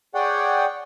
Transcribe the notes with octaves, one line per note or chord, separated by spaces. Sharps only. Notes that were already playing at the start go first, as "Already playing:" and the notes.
G#4 C#5 D5 F#5 G5